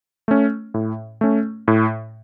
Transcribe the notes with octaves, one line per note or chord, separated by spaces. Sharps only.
A3 C#4
A2
A3 C#4
A2